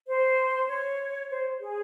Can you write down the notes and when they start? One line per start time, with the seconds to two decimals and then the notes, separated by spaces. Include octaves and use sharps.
0.08 C5
0.69 C#5
1.30 C5
1.61 G#4